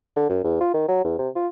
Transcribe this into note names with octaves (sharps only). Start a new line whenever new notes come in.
D3
F#2
E2
F4
D#3
F#3
E2
C3
F4